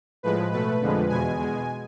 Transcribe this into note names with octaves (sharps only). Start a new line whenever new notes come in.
A2 F3 G#3 B4
B2 A3 B4
F2 D3 F3 G#3
E2 B2 G#3 G#5
B2 G#3